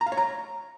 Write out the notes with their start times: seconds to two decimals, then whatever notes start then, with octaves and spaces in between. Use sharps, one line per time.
0.01 A#5
0.06 F5
0.12 C#5
0.17 A#5